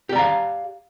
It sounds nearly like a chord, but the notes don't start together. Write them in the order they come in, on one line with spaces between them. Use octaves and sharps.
G4 D5 A#5 F5